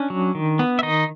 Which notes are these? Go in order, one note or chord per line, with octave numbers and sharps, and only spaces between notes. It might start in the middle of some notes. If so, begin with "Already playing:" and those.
Already playing: C#4 D4
F#3
D#3
B3
E5
D#3 D#4 D#5